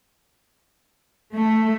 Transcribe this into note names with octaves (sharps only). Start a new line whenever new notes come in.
A3